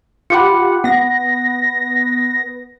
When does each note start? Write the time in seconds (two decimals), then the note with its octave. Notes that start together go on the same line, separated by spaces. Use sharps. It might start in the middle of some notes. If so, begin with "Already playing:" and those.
0.30 F4 G4 F#5 B5 D6 C#7
0.84 B3 F#5 A#6